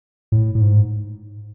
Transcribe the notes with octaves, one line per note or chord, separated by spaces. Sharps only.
A2
A2
G#2